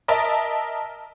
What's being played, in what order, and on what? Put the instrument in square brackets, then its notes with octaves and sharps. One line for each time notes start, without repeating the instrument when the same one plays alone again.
[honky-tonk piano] A#4 D#5 E5 A5